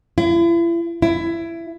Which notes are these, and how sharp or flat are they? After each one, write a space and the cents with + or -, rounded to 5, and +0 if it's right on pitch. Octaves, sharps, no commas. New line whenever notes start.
E4 +40
E4 +20